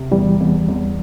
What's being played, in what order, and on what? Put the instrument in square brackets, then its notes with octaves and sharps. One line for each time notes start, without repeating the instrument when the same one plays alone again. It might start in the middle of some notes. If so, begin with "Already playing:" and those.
Already playing: [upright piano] C3
[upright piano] E2 [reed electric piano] E3 G3
[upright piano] E2
E2